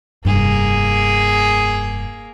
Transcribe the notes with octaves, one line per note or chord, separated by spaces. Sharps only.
F1 G2 A#3 G#4